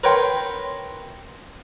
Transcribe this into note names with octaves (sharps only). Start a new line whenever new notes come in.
A#4 B4 C#5 G5 C6